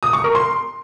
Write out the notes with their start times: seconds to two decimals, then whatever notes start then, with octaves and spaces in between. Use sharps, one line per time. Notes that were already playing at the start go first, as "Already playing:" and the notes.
0.03 D#6
0.13 C#6
0.24 A#4
0.35 C6